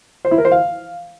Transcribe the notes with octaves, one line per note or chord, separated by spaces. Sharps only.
C5
E4
A#4
C5
F5